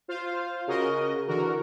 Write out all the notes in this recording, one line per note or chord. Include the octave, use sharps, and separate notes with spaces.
F4 C5 F5
C#3 F#4 A#4 D#5
D3 E3 F#4 A#4